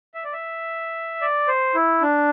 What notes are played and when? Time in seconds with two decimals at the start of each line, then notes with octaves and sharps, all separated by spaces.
0.14 E5
0.24 D5
0.33 E5
1.21 D5
1.48 C5
1.75 E4
2.02 D4